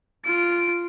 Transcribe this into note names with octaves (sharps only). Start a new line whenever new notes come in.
F4 D7